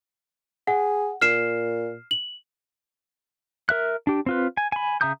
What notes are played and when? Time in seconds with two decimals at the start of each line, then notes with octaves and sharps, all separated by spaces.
0.67 G#4 F#5
1.21 A#2 F6 C7 E7
2.11 F#7
3.69 A#4 E5 F#6
4.07 D4 G4
4.26 C4 F4 B4
4.57 G#5
4.72 G#5 B5
5.01 C#3 E5 A#5 D#6 G6